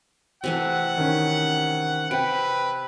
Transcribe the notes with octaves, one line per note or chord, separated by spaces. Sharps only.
C3 E3 A3 F#5
D#3 C#4
C3 B4 G5 D7